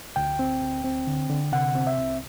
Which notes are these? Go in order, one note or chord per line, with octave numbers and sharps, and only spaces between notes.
D2 G5
C4
D2
C4
D3
D3
C3 F#5
C4
E5
C2